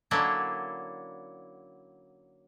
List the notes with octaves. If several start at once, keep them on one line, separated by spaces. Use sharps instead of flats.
D3 F#3 A#3 C#4 D4 E4